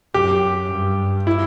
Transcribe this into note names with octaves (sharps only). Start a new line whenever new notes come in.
F#2 G4
G2
E4